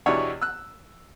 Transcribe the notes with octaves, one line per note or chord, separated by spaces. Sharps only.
E2 B2 D4 E4 G4 C#5
E6 F#6